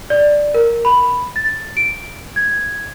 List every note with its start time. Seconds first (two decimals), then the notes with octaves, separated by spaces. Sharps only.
0.10 D5
0.54 A#4
0.85 B5
1.36 A6
1.77 D7
2.36 G#6